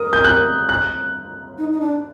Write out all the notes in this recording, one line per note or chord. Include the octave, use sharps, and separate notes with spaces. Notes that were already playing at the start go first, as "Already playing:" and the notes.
Already playing: A#4 D#6
G6
F#6
F#6
D#4
D#4
D4